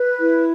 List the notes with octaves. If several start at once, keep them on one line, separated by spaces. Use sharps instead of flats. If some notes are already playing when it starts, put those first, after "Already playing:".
Already playing: B4
E4